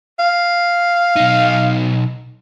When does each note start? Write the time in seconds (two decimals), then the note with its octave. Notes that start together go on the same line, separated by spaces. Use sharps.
0.19 F5
1.16 B1 D#4